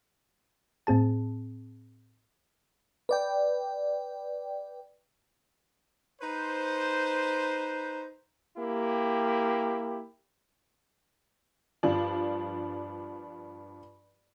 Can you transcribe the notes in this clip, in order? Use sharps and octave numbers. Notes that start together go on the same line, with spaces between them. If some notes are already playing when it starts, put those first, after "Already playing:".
A2 C4 G#4 A5
B4 D5 G5
D#4 B4 C5
A#3 E4 G4
G2 F3 D4